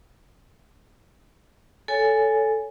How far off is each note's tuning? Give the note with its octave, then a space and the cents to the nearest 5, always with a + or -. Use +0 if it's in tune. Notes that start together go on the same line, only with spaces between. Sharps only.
A4 +0 C#5 +15 G#5 +0